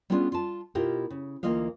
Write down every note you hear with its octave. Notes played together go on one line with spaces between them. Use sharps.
G3 B3 C#4 D4 F4 G#4
F4 A5
B2 E4 F4 G4 A#4
C#3
D2 E3 A#3 F4 D#5 F5